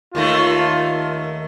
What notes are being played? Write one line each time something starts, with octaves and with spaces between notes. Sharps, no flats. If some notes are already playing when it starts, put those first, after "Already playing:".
D#2 D#3 A3 F4